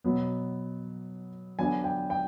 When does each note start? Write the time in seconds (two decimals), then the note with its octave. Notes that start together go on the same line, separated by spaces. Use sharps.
0.04 B2 F#3 B3
1.59 D3 F#3 B3 D4 G#5
1.84 G5
2.10 G5